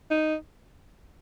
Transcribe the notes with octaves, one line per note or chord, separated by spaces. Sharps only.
D#4